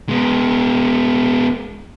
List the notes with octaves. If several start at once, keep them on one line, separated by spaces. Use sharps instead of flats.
G#3 B3